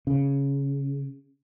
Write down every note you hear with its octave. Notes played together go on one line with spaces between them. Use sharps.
C#3